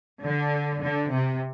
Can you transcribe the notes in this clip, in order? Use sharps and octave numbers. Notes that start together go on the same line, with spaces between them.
D3
D3
C3